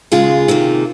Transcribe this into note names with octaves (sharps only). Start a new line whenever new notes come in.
D#2 C#3 G#3 F4 G#4
C3 D#3 A#3